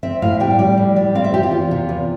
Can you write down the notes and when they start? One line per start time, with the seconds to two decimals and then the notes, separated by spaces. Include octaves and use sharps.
0.03 C4 E5
0.22 A2 F5
0.40 G3 G5
0.59 G3
0.78 A2
0.96 G3
1.15 C4 F5
1.24 E5
1.33 C4 G4
1.43 F4
1.51 E2
1.71 C3
1.89 E2